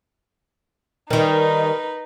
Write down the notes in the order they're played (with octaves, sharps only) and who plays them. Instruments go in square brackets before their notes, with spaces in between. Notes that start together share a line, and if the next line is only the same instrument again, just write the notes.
[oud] D#3 G3 [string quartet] D#4 B4 [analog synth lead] A#4